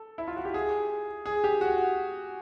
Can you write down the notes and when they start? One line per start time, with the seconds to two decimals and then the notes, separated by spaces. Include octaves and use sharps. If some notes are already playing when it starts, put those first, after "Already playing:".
Already playing: A4
0.18 E4
0.28 F4
0.36 F#4
0.45 G4
0.54 G#4
1.26 G#4
1.44 G4
1.61 F#4